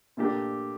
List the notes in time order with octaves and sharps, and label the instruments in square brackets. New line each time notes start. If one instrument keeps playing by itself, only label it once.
[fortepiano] A#2 A3 D4 G4